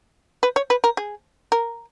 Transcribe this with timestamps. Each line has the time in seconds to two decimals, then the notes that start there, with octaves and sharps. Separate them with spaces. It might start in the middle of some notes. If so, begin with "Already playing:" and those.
0.43 B4
0.56 C#5
0.70 B4
0.84 A#4
0.97 G#4
1.52 A#4